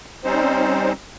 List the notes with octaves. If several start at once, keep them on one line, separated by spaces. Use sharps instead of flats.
G3 C4 C#4 D#4 C5